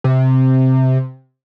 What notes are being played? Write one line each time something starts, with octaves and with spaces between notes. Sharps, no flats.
C3